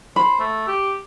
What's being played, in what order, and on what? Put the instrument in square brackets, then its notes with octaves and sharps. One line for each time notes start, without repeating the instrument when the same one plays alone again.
[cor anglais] C5 [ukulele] B5
[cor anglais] A3
G4